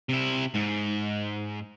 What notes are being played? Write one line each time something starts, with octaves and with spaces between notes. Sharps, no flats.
C3 E4
G#2